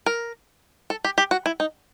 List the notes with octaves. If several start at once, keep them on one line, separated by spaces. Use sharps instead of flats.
A#4
A4
G4
G4
F#4
E4
D#4